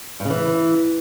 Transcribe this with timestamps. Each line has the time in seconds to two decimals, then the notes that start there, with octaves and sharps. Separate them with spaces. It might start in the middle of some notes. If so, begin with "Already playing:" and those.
0.20 G2
0.25 C#3
0.30 E3